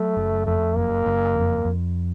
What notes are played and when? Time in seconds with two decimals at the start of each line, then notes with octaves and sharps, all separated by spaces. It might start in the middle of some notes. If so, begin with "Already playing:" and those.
Already playing: F#3 A3
0.16 F#1
0.46 F2 A3
0.76 F#1 A#3
1.06 F#1
1.35 F2
1.65 F2